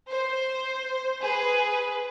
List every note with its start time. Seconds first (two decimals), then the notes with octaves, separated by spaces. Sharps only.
0.08 C5
1.23 G#4 B4